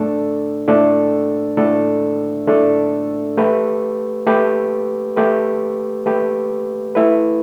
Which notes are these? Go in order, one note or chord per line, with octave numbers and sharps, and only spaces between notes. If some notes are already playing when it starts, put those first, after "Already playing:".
Already playing: A2 A3 D4 A4
A2 A3 D4 A4
A2 A3 D4 A4
A2 A3 D4 A4
A3 G4 B4
A3 G4 B4
A3 G4 B4
A3 G4 B4
A3 E4 B4